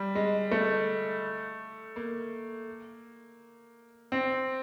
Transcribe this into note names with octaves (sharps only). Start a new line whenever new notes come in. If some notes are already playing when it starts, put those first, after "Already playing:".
Already playing: G3
G#3
A3
A#3
C4